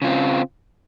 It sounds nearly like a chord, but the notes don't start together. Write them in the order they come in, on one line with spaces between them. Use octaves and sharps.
C#3 F4 C4